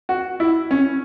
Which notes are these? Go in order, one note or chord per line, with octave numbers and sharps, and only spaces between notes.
F#4
E4
C#4